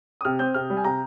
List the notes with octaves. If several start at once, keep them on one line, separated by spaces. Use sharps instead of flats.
D#6
C3 F6
C4 G6
C3 F6
G3
G#5
C3 A#5